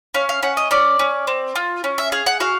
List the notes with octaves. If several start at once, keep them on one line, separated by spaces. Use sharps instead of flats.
C#4 F5
F5
C#4 F#5
D#5
C#4 D5
C#4
C4
F4
C#4
E5
G#4 F5
F#5
F#4 F5